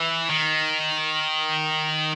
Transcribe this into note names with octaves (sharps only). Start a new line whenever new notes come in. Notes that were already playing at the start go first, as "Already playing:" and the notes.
Already playing: E3
D#3